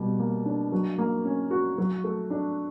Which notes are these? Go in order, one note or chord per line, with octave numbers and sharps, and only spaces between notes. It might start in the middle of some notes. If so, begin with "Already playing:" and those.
Already playing: B2 G3
A#3
D4
F#3
A#3
C#4
F#4
F#3
A3
D4